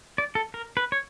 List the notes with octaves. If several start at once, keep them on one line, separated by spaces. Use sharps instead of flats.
D5
A4
A#4
B4
C#5